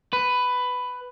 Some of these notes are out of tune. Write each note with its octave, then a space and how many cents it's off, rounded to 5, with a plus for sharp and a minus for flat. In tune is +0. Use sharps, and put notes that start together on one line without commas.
B4 +10